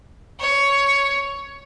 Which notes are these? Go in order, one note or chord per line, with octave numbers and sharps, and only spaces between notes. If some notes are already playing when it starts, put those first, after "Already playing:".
C#5